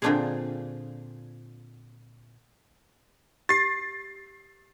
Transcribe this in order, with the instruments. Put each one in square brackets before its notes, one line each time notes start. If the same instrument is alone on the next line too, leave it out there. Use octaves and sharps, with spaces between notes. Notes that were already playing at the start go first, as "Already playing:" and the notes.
[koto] A#2 D3 C4 D4 F4 G#4
[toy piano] G4 [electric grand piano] A6 C7